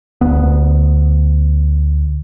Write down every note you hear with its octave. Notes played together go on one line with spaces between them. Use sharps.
D2 B3